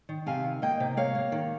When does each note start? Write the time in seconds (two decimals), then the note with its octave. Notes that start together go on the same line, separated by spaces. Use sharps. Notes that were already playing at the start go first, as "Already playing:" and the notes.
0.09 D#3
0.26 C3 F5 G#5
0.44 D#3
0.62 A#3 D#5 G5
0.80 C3
0.97 A#3 C#5 F5
1.15 A#3
1.32 D#3